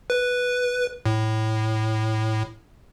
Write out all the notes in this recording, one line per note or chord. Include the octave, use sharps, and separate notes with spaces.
B4
A2